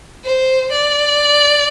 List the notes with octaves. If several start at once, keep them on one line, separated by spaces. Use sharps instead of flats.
C5
D5